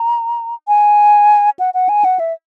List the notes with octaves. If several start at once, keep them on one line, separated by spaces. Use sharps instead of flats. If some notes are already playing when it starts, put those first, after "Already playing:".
Already playing: A#5
G#5
F#5
F#5
G#5
F#5
E5